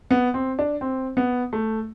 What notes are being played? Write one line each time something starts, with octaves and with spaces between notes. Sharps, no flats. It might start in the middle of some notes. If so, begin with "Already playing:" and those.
B3
C4
D4
C4
B3
A3